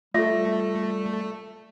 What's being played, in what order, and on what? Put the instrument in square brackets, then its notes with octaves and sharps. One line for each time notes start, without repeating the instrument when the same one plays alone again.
[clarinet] G3 [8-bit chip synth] A3 [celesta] F4 A4 [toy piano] E5